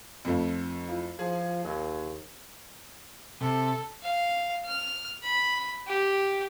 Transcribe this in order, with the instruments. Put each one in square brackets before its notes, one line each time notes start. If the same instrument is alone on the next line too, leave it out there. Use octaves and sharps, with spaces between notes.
[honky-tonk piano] F2 A3 [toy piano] D#4 F4 F5
[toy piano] E4 F4 F5
[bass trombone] F3 [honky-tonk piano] G#4
[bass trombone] D#2 [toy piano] A#4
[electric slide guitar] C3 [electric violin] A4
[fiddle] F5
F6
B5
G4